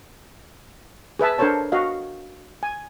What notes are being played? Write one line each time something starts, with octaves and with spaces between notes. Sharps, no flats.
G#4 B4 E5 A5
D4 A4 A#4 C5 C#5 A5
F#4 D#5 F5
G#5